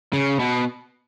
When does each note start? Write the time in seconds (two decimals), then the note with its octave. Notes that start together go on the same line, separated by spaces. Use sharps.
0.13 C#3
0.40 B2